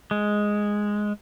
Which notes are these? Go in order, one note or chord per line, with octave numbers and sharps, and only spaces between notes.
G#3